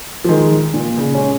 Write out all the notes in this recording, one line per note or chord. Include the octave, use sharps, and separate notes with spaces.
F3
D#3 G#3
A#2
C#3
G#3 C#4